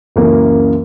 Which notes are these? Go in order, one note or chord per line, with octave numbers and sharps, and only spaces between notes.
C#2 F#2 E3 A#3 A#4